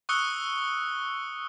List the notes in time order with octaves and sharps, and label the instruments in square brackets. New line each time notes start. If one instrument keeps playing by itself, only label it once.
[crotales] C#6 D#6 E6 F#6 C#7 G7